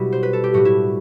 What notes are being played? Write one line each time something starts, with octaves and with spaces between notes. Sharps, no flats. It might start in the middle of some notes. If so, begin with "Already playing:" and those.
Already playing: B2 G3 E4 F#4
C5
B4
A4
G4
A2 G3 F#4
E4